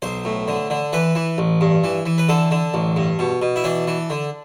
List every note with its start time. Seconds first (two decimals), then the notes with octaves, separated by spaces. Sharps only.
0.02 B1 C5
0.25 A2
0.48 D3
0.70 D3
0.93 E3 B4
1.15 E3
1.38 A1
1.61 G2
1.84 E3
2.06 E3
2.18 B4
2.29 D3 A4
2.51 D3
2.74 A1
2.96 G2
3.19 B2
3.42 B2
3.56 E4
3.64 E3 D4
3.88 E3
4.10 D3